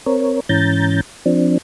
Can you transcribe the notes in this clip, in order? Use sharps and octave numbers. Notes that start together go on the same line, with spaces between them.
C4 A#4 C#5
G#2 E3 C#4 A#5 G6 A6
F3 C4 D4